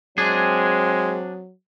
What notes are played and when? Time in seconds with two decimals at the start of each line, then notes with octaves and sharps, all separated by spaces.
0.18 F#3 G#3 C4 D4 G#4